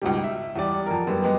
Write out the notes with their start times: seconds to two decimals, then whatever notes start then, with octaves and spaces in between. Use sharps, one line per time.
0.02 C#2 G#2 B2 G3
0.24 E5
0.56 E2 G3 D5
0.86 F2 A#4
1.07 F#2 G3 B3
1.22 G3 G#3 B3